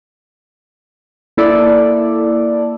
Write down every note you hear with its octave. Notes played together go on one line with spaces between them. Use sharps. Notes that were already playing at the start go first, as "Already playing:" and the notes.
A#3 E4 A4 D5